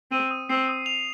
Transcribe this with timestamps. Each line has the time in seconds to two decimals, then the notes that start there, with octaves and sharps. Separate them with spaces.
0.11 C4 D#7
0.31 D#6
0.49 C4 C7
0.69 D#6
0.86 F7